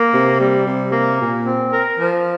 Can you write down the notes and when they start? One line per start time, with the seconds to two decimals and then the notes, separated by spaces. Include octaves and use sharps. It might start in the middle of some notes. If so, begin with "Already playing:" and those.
Already playing: A#3
0.12 C3
0.39 G3
0.66 C3
0.92 A#3
1.19 A#2
1.46 C4
1.73 A#4
2.00 F3